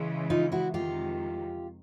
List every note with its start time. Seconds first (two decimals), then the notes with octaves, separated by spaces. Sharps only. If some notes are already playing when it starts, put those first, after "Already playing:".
Already playing: C#3 E3 G#3
0.30 D#4 F4
0.52 E4 F#4
0.74 F2 C3 D#3 G#3 F4 G4